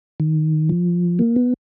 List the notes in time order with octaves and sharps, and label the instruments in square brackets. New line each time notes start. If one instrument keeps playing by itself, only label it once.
[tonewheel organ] D#3
F3
A#3
B3